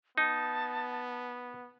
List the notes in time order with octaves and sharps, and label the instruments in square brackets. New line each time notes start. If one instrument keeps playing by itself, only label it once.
[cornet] B3 [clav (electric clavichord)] D#4 [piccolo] A5